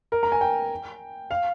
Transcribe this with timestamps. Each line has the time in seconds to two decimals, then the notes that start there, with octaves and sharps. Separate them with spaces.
0.12 A#4
0.23 A#5
0.32 G#5
0.41 G5
1.31 F5